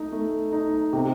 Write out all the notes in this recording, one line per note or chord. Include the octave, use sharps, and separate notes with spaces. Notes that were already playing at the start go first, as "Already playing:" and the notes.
Already playing: A3 D#4
A3
D#4
C3